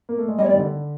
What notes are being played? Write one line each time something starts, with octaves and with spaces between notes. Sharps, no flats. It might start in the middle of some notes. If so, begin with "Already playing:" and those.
A#3
A3
G#3
G3 D#5
C#5
G3 D5
D#3
D3